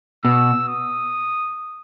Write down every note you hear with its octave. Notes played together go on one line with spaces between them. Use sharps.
B2 E6
D#6